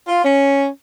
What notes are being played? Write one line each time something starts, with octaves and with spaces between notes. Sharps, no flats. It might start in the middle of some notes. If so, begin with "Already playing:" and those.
F4
C#4